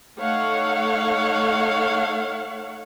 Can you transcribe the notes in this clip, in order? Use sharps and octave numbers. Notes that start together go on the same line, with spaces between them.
A3 D#4 A4 C#5 F5 F#5